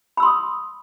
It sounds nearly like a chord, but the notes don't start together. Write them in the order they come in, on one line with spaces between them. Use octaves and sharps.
B5 E6 C6 D#6